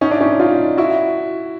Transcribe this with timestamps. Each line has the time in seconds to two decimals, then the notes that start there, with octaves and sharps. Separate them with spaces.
0.01 C#4 D#4
0.11 D4 E4
0.21 C#4 D#4
0.40 D#4 F4
0.77 E4 F#4